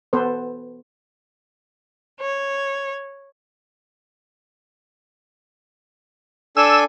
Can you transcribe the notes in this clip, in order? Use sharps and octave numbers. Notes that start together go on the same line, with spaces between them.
B3 A4 B4 C5
C#5
D4 A4 G#5 E6